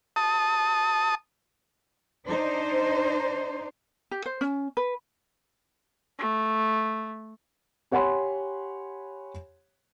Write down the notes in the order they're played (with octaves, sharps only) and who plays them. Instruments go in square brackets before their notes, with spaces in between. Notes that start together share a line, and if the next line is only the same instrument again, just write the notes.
[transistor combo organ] A5 D#6
[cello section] D4 D#4 C5
[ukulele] G4
C5
C#4
B4
[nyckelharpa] A3
[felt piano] G4 C#5 F#5 G#5 B5 C6